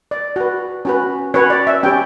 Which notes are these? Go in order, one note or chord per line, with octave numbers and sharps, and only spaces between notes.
D5
F#4 B4
C#4 F#4 B4
C#4 F#4 B4 C#5
D5
E5
C#4 G4 C#5 G5